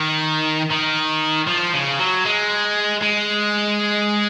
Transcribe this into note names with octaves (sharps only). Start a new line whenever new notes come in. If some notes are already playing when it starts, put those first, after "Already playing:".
Already playing: D#3
D#3
F3
C#3
F#3
G#3
G#3